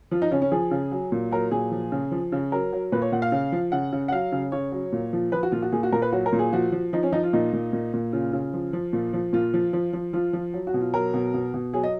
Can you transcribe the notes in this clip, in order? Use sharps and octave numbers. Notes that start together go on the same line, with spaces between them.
F3 F4
D#4
C#3 C#4
C#4
F3 G#4
C#3
F#3
A#2
F#3 A#4
A#2 G#4
F3
C#3
F3
C#3
F#3 A#4
F#3
A#2 B4
C#5
A#2 F#5
F5
C#3
F3
C#3 F#5
C#3
F#5
F#3 F5
C#3
C#3 C#5
F#3
A#2
F3
F3 B4
F#4
A#2 F4
F#4
A#2 G#4
F#4
A#2 A#4
B4
F#3 F#4
A#4
A#2
G#4
F3 F#4
F3
F3 D#4
C#4
F3 D#4
F4
A#2 D#4
A#2
A#2
A#2
C#3 F4
C#3
F3
F3
A#2
F3
A#2 F4
F3
F3
F3
F3 F4
F3
F#3
F#4
B2
F4
F#3 A#4
B2
B2
B2
F#3 G#4
D#5